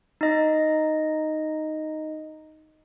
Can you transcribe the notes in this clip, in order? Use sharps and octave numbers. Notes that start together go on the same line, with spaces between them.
D#4 D#5